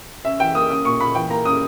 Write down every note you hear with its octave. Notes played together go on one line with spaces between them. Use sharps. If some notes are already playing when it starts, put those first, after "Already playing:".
C#4 E5
E3 G5
A#3 D#6
C#4 D#6
A#2 C#6
A#2 B5
E3 G5
A#3 A#5
C#4 D#6